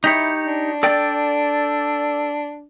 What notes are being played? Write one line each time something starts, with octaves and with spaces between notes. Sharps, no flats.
D#4 E4 G4 C#5
D4
A4 D5 G5